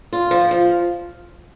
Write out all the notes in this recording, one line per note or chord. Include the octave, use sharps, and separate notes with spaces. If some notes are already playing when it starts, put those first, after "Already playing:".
F4
F3
F3